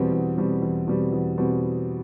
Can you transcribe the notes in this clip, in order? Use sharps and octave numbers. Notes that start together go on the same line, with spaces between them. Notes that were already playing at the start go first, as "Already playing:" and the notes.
Already playing: E2 B2 G3 C4
E2
B2 G3 C4
E2
B2 G3 C4
E2
B2 G3 C4